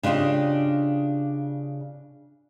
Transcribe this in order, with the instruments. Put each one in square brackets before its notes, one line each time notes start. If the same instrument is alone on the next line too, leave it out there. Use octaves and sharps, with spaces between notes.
[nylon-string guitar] C#3 D4 F4 G4 D#5